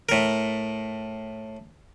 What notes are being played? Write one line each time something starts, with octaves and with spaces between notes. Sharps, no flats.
A2 A#4